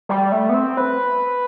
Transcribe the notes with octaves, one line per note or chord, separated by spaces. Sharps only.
G3
A3
B3
C4
B4